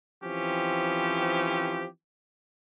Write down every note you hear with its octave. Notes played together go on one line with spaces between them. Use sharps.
E3 F3 C4 C#4 G4